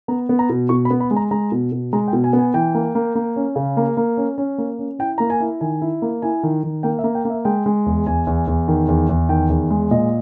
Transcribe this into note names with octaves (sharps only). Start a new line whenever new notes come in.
B3 A#5
B3
A#5
B2
B2 C#6
B5
B3
B5
G#3
A#5
G#3 A#5
B2
B2
G#3 A#5
G5
B2
G#5
B3
G#5
E3 G5
A#3
A#3
A#3
C#4
C#3
A#3
A#3
C#4
C#4
A#3
C#4
E4 G5
A#3 A#5
G#5
E4
D#3 G#5
E4
A#3
E4 G#5
D#3
D#3
A#3 G5
E5
A#3
G5
A#3
E5
G#3 G5
G#3
E2
E2 G#5
E2
E2
D#3
E2
E2
D#3 G5
E2
G#3
A#2 D#5